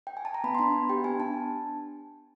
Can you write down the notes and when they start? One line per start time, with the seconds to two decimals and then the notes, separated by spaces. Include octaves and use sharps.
0.07 G5
0.17 G#5
0.25 A5
0.34 A#5
0.44 B3 B5
0.55 C6
0.59 D4 B5
0.74 B3
0.89 G4 G5
1.04 B3 G#5
1.20 D4 A5